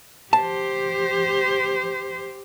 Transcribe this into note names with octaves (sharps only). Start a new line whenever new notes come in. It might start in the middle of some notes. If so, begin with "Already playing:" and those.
G4 C5 A5